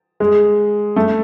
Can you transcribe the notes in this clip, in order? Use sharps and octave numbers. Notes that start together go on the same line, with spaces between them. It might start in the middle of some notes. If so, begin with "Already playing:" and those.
G#3
A3